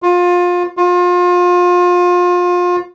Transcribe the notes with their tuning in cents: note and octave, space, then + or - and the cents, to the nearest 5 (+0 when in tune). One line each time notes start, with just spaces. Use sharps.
F4 +25
F4 +30